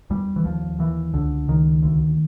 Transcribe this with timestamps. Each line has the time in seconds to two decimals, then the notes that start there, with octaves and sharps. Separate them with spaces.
0.10 E2 G3
0.36 E3
0.45 D#2 F3
0.79 D#2 E3
1.13 C#2 D3
1.48 C#2 D#3
1.83 D2